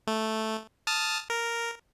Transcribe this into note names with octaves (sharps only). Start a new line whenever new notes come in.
A3
A5 D#6 F6
A#4